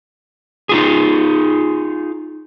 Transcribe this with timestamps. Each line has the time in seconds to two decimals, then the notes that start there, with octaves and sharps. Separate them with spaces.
0.69 D#4 F4 G#4